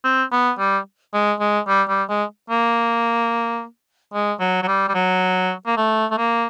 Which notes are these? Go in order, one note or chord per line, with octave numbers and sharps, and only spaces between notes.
C4
B3
G3
G#3
G#3
G3
G3
G#3
A#3
G#3
F#3
F#3
G3
G3
F#3
A#3
A3
A3
A#3